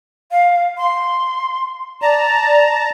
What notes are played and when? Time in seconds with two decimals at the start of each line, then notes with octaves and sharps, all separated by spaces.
0.31 F5
0.78 C6
2.02 D5 A5 A#5